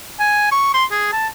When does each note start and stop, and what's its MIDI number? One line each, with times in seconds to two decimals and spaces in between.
0.20 0.51 80
0.52 0.71 85
0.74 0.85 84
0.91 1.11 68
1.12 1.27 81